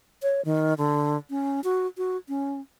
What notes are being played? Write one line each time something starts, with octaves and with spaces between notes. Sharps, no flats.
C#5
D#3
D3
C#4
F#4
F#4
C#4